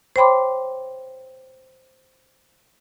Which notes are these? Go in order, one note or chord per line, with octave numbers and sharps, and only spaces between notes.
C5 C#5 G5 B5 C6 D6